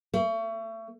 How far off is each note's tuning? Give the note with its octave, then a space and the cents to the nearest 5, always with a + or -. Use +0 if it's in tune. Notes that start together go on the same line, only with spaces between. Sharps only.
A3 +35